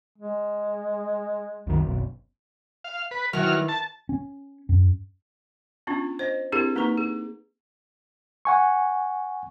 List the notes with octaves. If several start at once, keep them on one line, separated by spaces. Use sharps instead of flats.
G#3
C2 F#2 D#3
F#1 B1
F5
B4
D#3 E3 F#3 F6
A5
C#4
F#2
B3 C#4 D4 F4
C5 D#5
C4 D4 E4 G4 G#4 A#4
A#3 D#4 B4 A#5 C#6
G#4
F#5 G#5 C#6